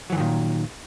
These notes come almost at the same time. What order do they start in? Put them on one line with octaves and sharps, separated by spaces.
F#3 E3 G2 D#3 A#2